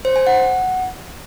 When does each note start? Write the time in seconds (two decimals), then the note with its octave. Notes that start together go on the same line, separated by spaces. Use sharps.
0.05 C5
0.16 G#5
0.27 F#5